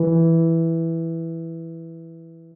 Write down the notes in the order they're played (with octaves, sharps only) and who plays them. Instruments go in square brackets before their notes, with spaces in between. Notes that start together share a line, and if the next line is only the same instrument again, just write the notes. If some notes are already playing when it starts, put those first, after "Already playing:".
Already playing: [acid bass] E3